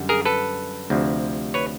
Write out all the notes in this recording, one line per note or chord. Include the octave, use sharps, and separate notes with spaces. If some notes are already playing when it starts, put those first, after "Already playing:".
Already playing: F#2 D3 G3
G#4 A#4
A4 B4
D2 C3 F3
B4 C#5